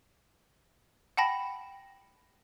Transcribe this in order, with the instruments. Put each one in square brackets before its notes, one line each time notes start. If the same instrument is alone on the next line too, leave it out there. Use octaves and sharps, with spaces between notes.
[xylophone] F#5 G5 A5 B5 A#6